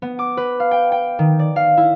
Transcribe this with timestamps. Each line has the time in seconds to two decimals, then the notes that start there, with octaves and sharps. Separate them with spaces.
0.02 B3
0.19 D6
0.37 B4
0.60 F5
0.71 G5
0.92 G5
1.19 D#3
1.39 D5
1.56 F5
1.77 E4